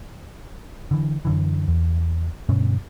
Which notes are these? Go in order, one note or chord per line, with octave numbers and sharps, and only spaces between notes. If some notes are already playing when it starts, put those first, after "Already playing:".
D3 E3
F#2 D3 E3
E2
D2 G2 B2 C#4